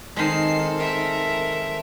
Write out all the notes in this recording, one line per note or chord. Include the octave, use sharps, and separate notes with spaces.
D#3 G#3 C4 A4 C7
A#4 E5